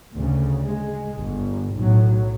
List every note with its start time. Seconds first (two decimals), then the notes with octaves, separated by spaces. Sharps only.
0.15 D2 C#3
0.65 G#3
1.18 G1
1.75 B1 A2 F#3